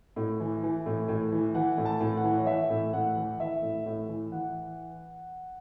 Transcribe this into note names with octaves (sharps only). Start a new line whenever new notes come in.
A2
E3
E3
A2
A2
E3
E3 F#5
A2
A5
A2
F#5
E3
C#5
E3 E5
A2
A2 F#5
E3
E3 E5
A2
A2
E3
E3 F#5